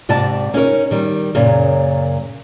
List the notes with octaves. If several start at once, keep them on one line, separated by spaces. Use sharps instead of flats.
G#2 C3 D5 D#5 A5
C#4 D#4 A#4 C#5
D#3 G3
F#2 A#2 C#3